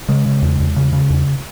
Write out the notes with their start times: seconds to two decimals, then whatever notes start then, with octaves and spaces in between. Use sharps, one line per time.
0.09 C#3 G#3
0.26 C#3
0.42 E2
0.60 E2
0.76 C#3
0.93 C#3
1.10 E2